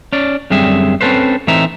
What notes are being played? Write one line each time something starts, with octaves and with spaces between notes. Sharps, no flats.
C#4 D5
F#2 D3 G3 C4 G#4 E5
C4 C#4 A4 B4 C5
A2 E3 C4 D#4 E5 A#5